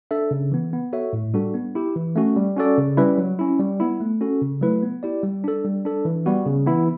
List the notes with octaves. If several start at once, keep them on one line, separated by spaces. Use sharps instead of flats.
D4 A4 E5
C#3
E3 B3
B3
F#4 A4 C#5 E5
A2
G3 D4 F#4 A4
B3
E4 G4
E3
A3 C#4 F#4
G3
C#4 F#4 A4 D5
C#3
G3 C#4 E4 B4
F#3
C#4 E4
G3
B3 E4
A3
C#4 F#4 A4
C#3
F#3 A3 E4 B4
B3
E4 G4 D5
G3
D4 A4
G3
D4 A4
E3
G3 B3 F#4
C#3
E3 B3 E4